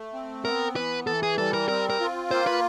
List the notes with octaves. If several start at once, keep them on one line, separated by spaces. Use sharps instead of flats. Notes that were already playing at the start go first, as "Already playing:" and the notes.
Already playing: A3
C4
B3 A#4
E3 B4
E3 A4
G#4
G3 A4
A#4
C4 A#4
A#4
F4
A#3 C5
B4